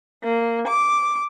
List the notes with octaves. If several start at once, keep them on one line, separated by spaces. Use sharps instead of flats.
A#3
D6